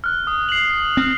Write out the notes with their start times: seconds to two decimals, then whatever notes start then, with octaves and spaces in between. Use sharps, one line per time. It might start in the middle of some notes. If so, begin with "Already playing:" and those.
0.04 F6 F#6
0.27 D#6
0.49 C7 F#7
0.97 C4 F6